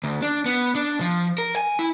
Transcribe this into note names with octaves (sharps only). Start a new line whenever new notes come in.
D2
D4
B3
D4
F3
A#4
G#5
E4